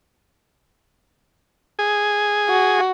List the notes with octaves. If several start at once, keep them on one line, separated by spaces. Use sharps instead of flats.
G#4
F#4